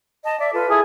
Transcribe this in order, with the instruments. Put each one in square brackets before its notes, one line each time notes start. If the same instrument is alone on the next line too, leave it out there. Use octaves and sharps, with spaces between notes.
[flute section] D#5 A5
D5 E5
F4 A4 B4
[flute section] E4 A4 [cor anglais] G#4